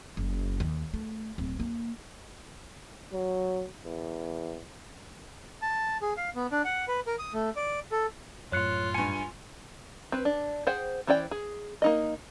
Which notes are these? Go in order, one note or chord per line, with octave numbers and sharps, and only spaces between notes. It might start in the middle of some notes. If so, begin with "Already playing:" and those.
F#1
D#2
A3
D1
A#3
F#3
E2
A5
G#4
F5
B3
D4
F#5
B4
A#4
D#6
A3
D5
A4
F#2 A2 F4 C#5 F#6 C#7
G2 G#5 C#7
C4 B4
D4
G#4 C5 F#5 G5
E3 C#4 C5 D5 G5
G#4
A#3 D#4 D#5